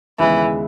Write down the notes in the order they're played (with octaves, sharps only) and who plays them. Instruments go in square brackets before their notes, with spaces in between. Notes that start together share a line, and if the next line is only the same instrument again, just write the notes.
[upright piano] D#2 C#3 G#3 B3 [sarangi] E3